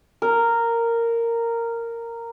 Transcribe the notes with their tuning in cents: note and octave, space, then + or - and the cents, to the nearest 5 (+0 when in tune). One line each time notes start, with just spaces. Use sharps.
A#4 -10